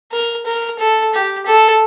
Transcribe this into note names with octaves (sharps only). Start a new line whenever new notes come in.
A#4
A#4
A4
G4
A4